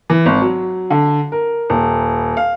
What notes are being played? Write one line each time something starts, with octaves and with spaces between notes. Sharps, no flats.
E3
G#1
F#3
D3
A#4
D#1
F5